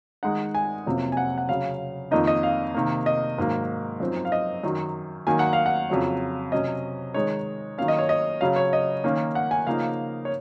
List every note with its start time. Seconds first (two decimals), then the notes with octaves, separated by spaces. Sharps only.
0.23 D#3 G#3 D#4 F#5
0.55 G#5
0.86 F2 C3 F#3 A#3 C#4
1.12 G#5
1.17 F#5
1.38 F#5
1.49 C#3 F#3 C#4 F5
2.11 F2 D#3 A#3 D#4 D#5
2.27 D#5
2.43 F5
2.74 C3 D#3 A#3
3.06 D#5
3.38 G#2 D#3 F#3 A#3
4.00 F#2 F3 C4 D#4
4.25 F5
4.32 D#5
4.63 F#2 D#3 F#3
5.27 D#3 F#3 A#3 G#5
5.39 F#5
5.53 F5
5.66 F#5
5.90 F2 C#3 F#3 C#4
6.52 C3 F#3 C#4 D#5
7.14 D#3 G#3 D#4 C#5
7.78 D#3 F#3 A#3 C#4 F5
7.88 D#5
7.99 C#5
8.09 D#5
8.41 C#3 F#3 C#4 F5
8.56 C#5
8.73 D#5
9.04 D#3 A#3 C#4
9.35 F#5
9.51 G#5
9.67 C#3 F3 A#3 D#4 F5
10.25 C#5